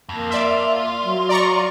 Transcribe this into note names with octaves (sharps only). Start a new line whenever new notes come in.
F2 A#3
F4 D5 E5
F#3
D5 A#5 C#6